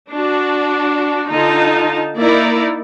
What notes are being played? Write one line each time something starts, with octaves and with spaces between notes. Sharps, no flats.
D4 F#4
D3 D#4 F4 A5
A#3 D#4 E4 A#4 D5